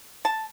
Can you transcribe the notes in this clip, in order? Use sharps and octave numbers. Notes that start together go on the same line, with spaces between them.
A5